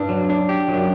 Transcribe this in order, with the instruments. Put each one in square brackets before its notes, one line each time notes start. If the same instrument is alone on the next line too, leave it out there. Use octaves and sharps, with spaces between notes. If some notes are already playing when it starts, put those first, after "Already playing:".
Already playing: [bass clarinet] G2 [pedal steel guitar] D4
[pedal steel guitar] F#3
D4
G4
[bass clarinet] F#2 [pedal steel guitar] F#3